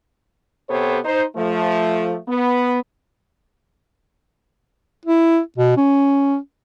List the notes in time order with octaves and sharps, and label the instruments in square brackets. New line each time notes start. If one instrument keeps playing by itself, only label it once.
[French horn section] C3 B3 G4 A4 C5 C#5
D#4 C5
F3 A3
B3
[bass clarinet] E4
B2
C#4